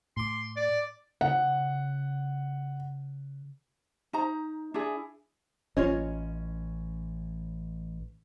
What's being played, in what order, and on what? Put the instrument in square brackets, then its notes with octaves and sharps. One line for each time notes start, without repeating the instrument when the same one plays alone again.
[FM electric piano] A2 D6 [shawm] C6
[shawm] D5
[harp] C#3 [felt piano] F#5
[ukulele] D#4 C5 A#5
D4 E4 G#4
[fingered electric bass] A1 [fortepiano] C#4 [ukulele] F4 C#5 D#5